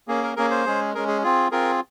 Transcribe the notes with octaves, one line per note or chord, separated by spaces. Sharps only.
A#3 C#4 G#4
A#4
A#3 C#4 G#4 A#4
C5
G#3 C#4 G#4
G#3 C#4 G#4 A#4
G#4
C4 F4 G#4
C4 F4 G#4 A#4